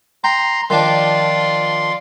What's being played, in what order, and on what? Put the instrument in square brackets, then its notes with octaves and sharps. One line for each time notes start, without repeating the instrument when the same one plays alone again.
[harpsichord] G5 [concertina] A#5 C6
[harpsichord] D#3 F3 D4 [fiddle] F4 D5 [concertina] C6